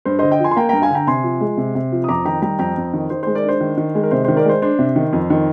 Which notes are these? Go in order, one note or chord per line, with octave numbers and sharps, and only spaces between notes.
G2 C5
D3 C5 D#5
D#5 G5
F3 G#5 C6
C6
A#3 G5 A#5
G2 G5 A#5
F5 G#5
D3 G5 A#5
C3 G#5 C6
F3
G#3
C3
C3
F3
D#6
F2 A#5 D6
D#3 G5 A#5
G3 G5 A#5
F2 G5 A#5
F2
D#3
D#3 C5
G#3 C5
A#4 D5
D4 C5
D#3
D#3
G#3
A#4
C3 C5
D#3 C5
A#4 D5
G#3 C5
D4 C5
C3
D#3
F2
D#3